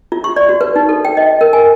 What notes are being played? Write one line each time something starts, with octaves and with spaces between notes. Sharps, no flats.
F4
C#6
D5
F#4
B4
D#4
A4
G5
D#5
A#4
G#5